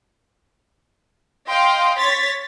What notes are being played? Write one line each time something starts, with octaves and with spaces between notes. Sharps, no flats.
D#5 F5 G5 C6
C#5 A6 B6